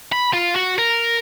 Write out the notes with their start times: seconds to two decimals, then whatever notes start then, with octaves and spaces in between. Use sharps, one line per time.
0.12 B5
0.34 F4
0.56 F#4
0.78 A#4